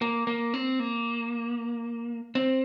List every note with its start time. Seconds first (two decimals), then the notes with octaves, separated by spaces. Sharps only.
0.02 A#3
0.27 A#3
0.54 C4
0.80 A#3
2.35 C4